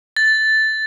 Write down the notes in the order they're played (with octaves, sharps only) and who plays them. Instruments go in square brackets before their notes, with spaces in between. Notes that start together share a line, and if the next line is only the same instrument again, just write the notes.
[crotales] A6